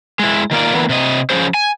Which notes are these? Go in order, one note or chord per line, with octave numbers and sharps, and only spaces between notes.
G#3 E4
D#3 A#3 F4 D5
D3 E3 A#3 B3
C3 D#5
F3 C#4 G#4 C5
G#5